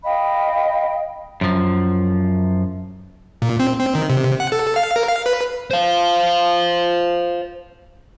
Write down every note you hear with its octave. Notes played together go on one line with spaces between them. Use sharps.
D#5 F5 G5 B5
F#2 F3
A#2
C4
C4
D#3
C3
F#5
A4
F5
A#4
F5
B4
C5 F5